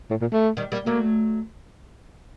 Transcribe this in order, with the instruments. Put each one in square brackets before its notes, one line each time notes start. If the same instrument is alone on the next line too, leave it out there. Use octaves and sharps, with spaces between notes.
[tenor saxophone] A2
A#2
A3
[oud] D#3 G3
G3 A#3
[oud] F#3 A3 [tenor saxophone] A#3